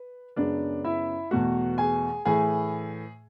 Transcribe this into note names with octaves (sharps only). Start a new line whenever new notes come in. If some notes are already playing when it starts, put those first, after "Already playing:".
Already playing: B4
F#2 C#3 G#3 B3 D4 D5
E4 E5
E2 B2 A3 F#4 F#5
G#4 G#5
A2 E3 A3 G#4 G#5